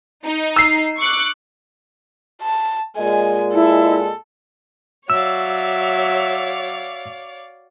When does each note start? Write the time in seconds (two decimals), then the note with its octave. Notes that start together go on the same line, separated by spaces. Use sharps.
0.25 D#4
0.56 E6 C7
0.98 C#6 D6 F#6
2.42 A5
2.97 A#2 G#3 G#5
3.53 E4 A4
5.10 F#3 C#5 D5 E5 F5 E6